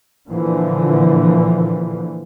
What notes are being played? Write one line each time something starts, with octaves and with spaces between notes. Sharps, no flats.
A#2 D3 E3 F3